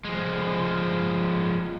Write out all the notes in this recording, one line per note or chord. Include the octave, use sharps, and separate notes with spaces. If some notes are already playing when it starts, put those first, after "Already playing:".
F3 G#3